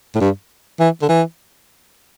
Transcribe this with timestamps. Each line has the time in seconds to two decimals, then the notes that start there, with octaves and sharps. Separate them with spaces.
0.15 A2
0.21 G2
0.80 E3
1.02 D3
1.09 E3